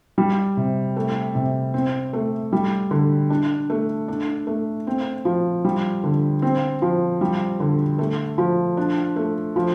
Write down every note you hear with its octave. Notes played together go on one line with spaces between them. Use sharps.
G3
C3
A3
C3
C4
A3
G3
D3
D4
A3
D4
A3
C4
F3
G3
D3
C4
F3
G3
D3
A3
F3
D4
A3
F3